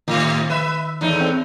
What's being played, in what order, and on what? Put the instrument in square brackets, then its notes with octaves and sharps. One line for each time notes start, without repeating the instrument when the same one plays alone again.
[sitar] A2 C3 [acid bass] D#3
[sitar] B4 E5
E2 A2 D#4
[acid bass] C4